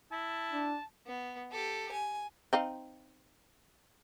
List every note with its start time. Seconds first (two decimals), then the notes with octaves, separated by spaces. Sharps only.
0.12 E4 A5
0.52 D4
1.07 B3
1.52 G4 A4
1.92 G#5
2.53 C4 D#4 F5